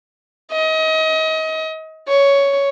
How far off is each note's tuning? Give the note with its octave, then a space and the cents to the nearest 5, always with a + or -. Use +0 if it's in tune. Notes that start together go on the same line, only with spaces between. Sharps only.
D#5 +30
C#5 +10